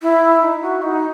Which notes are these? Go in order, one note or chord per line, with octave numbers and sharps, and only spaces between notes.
E4
D#4
F#4
D#4